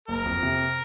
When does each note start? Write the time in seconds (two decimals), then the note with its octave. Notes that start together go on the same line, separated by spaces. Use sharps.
0.08 F#1 A#4
0.26 F2
0.43 C3